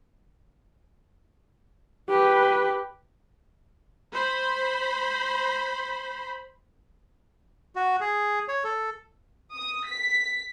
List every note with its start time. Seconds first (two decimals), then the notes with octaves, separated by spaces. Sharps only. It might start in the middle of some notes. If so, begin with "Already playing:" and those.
2.09 G4 B4
4.13 C5 B5
7.76 F#4
8.01 G#4
8.48 C#5
8.64 A4
9.55 D#6
9.87 B6